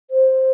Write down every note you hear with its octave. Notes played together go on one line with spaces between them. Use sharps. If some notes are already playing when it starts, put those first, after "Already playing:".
C5